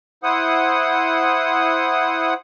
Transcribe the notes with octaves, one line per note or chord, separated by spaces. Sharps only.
E4 C5 F#5 D#6